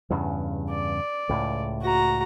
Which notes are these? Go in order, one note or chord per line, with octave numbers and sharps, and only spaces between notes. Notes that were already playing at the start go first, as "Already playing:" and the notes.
E2 G2 C#3
D5
C#2 A2
F#4 A#5